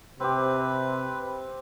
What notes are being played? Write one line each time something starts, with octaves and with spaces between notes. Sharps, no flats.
C3 C4 G4 B4